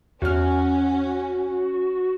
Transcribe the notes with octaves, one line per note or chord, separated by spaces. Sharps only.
E2 C#4 F#4 F6